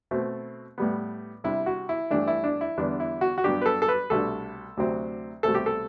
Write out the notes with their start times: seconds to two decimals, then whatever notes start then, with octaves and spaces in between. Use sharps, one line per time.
0.11 B2 A3 C4
0.78 A2 G3 B3
1.44 C3 G3 D4 E4
1.66 F#4
1.89 E4
2.11 G2 E3 A3 D4
2.28 E4
2.44 D4
2.61 E4
2.77 E2 D3 G3 B3 D4
3.00 E4
3.21 F#4
3.38 F#4
3.44 G2 F#3 B3 D4 G4
3.62 B4
3.66 A4
3.82 A4
3.88 B4
4.10 C2 B2 A3 D4 A4
4.77 D2 C3 F#3 C4
5.43 C2 B2 A3 C4 A4
5.55 G4
5.66 A4